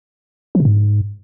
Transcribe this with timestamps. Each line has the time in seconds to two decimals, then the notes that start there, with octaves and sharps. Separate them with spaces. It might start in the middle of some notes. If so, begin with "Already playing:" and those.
0.55 F3
0.60 C3
0.65 G#2